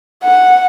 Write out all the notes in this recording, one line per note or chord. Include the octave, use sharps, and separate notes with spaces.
F#5